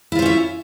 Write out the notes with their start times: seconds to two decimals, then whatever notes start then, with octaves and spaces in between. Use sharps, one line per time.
0.12 E4
0.15 F4
0.19 C5
0.22 C#4
0.26 E5